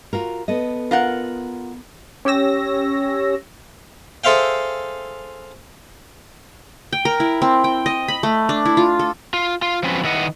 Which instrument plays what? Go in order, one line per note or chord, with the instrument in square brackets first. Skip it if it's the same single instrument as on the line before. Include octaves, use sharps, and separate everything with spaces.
[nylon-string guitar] F4 F#4 A#4
B3 A4 D#5
[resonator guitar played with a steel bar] F4 A#4 F#5
[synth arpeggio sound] C#4 G4 C#5 E6 A#6
[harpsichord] G#4 A4 C5 E5 F5 G5
[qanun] G5
A#4
E4
C4
G5
D#5
B5
A3
D4
E4
F4
A4
[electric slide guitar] F4
F4
F3 F#3 C4 C#4 B4
D#3 E4 B4 D#5 F#5